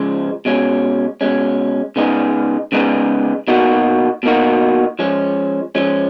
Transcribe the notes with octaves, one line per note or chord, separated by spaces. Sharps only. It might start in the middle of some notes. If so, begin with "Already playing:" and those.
Already playing: C#3 F3 G#3
B2 G#3 C#4
B2 G#3 C#4
C#3 G#3 B3 D#4 G#4
C#3 G#3 B3 D#4 G#4
B2 A#3 D#4 F#4
B2 A#3 D#4 F#4
F3 G#3 C#4
F3 G#3 C#4